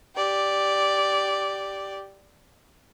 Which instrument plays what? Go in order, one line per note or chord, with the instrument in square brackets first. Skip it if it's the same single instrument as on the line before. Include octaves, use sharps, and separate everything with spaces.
[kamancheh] G4 D5